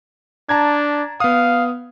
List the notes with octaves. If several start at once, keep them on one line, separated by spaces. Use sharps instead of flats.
D4 A5 A#5 G#6
B3 F5 D#6